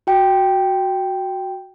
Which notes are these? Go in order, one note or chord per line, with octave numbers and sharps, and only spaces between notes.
F#4 G5